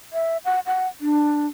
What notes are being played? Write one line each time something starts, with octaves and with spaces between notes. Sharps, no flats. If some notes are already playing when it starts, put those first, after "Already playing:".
E5
F#5
F#5
D4